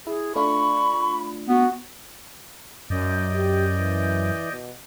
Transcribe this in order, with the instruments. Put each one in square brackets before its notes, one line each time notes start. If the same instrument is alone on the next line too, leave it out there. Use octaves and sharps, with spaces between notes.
[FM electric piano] E4 [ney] G#4
[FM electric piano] A3 D4 F4 [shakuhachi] B5 [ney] C#6
[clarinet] B3 [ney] F#4
[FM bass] F#2 [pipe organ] D5 D#5 G6
[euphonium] G4
E3
B2